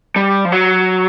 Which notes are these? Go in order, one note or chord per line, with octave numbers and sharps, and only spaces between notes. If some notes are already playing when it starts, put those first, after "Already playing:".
G3
F3
F#3